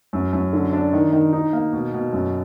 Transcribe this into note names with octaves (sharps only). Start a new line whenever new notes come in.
F#2
F#2
D3
D4
D#3
D#3
D#4
A#3
B2
B2
F#2